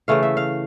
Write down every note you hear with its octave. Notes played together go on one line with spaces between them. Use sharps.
C#3 E3 A3 F5
E5
F5